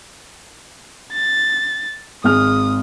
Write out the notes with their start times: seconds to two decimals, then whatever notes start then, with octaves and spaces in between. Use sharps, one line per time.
1.13 A6
2.24 G#1 G#3 D#6 F6